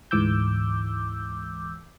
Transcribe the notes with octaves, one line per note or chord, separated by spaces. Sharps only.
D2 G#2 E3 D6 E6 G6